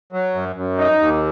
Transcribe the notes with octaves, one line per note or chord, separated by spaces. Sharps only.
F#3
F#2
F#2
D#4
D#2